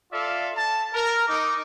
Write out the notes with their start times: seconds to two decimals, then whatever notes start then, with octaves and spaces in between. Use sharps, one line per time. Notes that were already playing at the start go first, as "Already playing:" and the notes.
0.12 F4 A4 D5 E5 F5
0.54 A5
0.93 A#4
1.28 D#4 D6